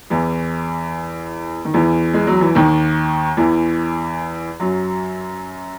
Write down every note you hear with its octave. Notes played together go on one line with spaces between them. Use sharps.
E2 E3
D#3
E2 E3
G#3
F#3
E3
D#2 D#3
E2 E3
F#2 F#3